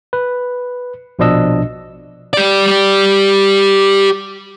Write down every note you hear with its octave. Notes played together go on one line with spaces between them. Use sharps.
B4
A#1 B2 F3 D4 D#5 E6
G4 D5